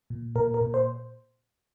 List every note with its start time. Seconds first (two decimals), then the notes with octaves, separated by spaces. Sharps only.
0.10 A#2
0.35 A#2 A#4
0.54 A#4
0.61 A#2
0.74 C5